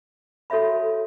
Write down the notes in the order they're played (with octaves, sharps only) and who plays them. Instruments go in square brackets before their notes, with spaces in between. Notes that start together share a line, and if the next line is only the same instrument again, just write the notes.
[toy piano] F#4 A4 C#5 E5 B5